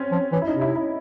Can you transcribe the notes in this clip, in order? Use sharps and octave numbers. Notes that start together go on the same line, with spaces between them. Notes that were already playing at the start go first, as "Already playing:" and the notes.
Already playing: C4 C#4
F3
E3 C#4
E4
D#4
C3
E4
E4